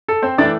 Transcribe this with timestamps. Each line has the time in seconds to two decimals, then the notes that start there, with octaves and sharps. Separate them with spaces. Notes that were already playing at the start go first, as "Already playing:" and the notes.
0.08 A4
0.22 C4 C5
0.38 A2 E3 A3 D4 D5